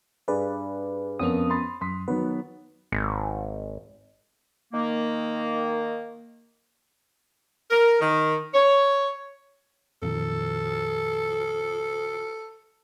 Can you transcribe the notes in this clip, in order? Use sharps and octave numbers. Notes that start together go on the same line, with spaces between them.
G2 G#4 B4 D5
F2 B3 C#4 A#4 D#6 F7
B5 C6 A6
F#2 C6 D#6 B6
D#3 F#3 B3 B4
G#1
D#3 A#3
A#4
D#3
C#5
F2 A#2 D#3 A4